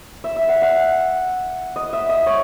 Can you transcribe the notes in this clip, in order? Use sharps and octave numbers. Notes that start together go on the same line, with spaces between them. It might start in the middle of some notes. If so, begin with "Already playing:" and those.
E5
E5
F#5
F#5
D#5
E5
D#5
C#5